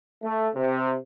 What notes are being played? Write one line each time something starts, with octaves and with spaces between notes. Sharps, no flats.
A3
C3